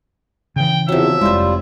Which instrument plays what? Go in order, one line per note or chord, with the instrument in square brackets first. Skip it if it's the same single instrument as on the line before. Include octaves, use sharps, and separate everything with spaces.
[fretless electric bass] C#3 E3 [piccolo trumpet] G5
[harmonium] E2 C3 [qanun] F3 F#3 [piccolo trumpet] E5
[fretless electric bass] F1 G#3 [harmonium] G3 F4 [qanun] E4 C5